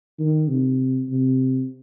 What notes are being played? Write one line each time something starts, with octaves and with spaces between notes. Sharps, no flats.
D#3
C3
C3